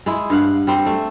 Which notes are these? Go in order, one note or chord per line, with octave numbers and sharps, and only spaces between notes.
G#3 E4
G2 F5 F#5
G3 C4 C5
A3